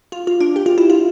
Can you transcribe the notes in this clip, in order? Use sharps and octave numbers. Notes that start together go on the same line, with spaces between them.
F4
F4
D4
G4
F4
E4
F4